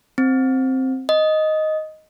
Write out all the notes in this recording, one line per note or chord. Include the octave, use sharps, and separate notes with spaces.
C4
D#5